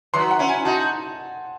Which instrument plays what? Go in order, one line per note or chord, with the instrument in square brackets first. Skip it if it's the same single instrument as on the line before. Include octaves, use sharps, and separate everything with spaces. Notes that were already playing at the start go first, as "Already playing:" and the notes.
[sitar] D#3 F#3 [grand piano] C6
[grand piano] F#5
[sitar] C#4 E4
[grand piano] G#5
[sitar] D#4 F#4 [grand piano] A5